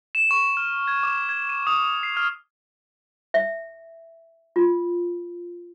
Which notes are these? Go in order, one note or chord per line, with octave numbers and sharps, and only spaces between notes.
E7
C#6
F6
G#6
D6
G#6
D#7
D#6
C7
F6
E5
F4